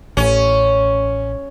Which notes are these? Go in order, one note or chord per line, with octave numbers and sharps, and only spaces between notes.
A1 C#4